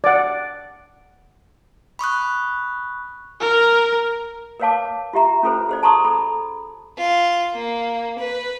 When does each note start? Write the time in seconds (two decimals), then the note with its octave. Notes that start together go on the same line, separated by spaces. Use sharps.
0.04 D5 F#5
1.99 B5 C#6 D#6 F#6
3.40 A#4
4.60 A#4 B4 C#5 F5 A5 D6
5.13 F4 G4 E5 A#5
5.43 C#4 F4 A4 B4 C5
5.69 G#4 C5 D5
5.83 A5 A#5 C6 C#6 D#6
6.04 A4 B5
6.98 F4
7.55 A#3
8.19 B4